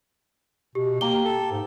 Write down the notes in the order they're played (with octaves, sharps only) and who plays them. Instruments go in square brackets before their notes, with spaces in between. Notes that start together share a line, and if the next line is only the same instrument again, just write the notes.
[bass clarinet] B2 [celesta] G4
[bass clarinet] A#3 [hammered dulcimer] G4 A#5 [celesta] G7
[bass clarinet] A4
G#2